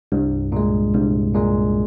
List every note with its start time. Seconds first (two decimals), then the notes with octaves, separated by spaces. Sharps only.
0.12 C2 G2
0.52 A#2 G#3
0.94 C2 G2
1.34 A#2 G#3